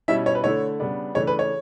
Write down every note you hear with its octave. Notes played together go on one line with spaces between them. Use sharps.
B2 G3 C#4 E4 E5
C#5
B4
D3 A3 E4 C#5
C#3 G3 B3 D4
C#3 E3 A3 D4 C#5
B4
C#5